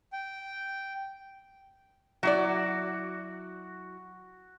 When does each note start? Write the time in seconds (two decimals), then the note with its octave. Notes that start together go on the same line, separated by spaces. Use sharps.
0.13 G5
2.23 F#3 E4 F#4 D5